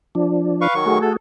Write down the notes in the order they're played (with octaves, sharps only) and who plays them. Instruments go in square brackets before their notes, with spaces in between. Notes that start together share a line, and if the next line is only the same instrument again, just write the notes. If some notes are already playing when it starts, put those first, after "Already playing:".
[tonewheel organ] F3 D4
[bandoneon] B4 F5 C#6
D#3 F#3 C#6
[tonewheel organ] A3 F#4 G#4
[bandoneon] A4